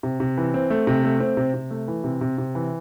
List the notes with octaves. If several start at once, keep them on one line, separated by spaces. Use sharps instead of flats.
C3
C3
E3
C4
A3
C3
A3
C4
C3
C3
A3
E3
C3
C3
C3
E3